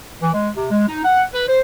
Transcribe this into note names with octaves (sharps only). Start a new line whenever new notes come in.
E3
G#3
C3
G#3
D#4
F#5
B4
C5